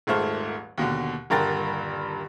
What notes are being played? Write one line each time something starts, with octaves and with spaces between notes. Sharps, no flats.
D#1 G#1 G#2 A3 C5 F6
D#2 B2 D3
D#1 G2 D3 A#4 G5 A6